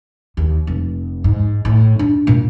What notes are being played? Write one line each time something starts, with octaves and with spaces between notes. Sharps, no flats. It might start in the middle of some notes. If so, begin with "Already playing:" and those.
D#2
F1
G#2
A2
D4
A#2